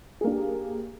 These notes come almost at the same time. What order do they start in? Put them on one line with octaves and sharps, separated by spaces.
G#4 A#3 D4 G4